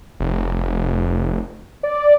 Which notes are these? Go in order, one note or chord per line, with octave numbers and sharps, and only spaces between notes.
F1
D5